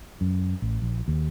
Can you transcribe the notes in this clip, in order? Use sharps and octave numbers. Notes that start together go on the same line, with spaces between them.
F#2
A1
A#1
D#2